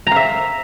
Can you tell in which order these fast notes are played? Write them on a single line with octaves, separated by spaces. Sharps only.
A#5 F5 E5